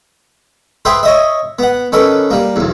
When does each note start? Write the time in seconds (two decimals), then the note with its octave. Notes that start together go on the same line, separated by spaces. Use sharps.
0.85 G#4 B4 C5 E5 G5
1.03 C#5 D#5 E5
1.59 B3 F#5
1.92 D#3 C#4 A4 B4
2.30 G3 A#3
2.56 B1 E2